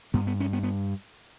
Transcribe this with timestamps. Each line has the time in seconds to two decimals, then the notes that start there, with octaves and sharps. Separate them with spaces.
0.14 G2 B3
0.27 B3
0.40 C#4
0.53 B3
0.63 B3